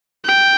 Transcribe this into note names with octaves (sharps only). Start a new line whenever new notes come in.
G5